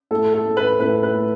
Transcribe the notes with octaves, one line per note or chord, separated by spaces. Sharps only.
A2 A4
A4
A3
B4
A2 B4
B4
A3